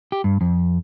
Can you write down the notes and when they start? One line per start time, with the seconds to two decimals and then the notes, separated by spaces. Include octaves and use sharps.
0.12 G4
0.24 G2
0.41 F2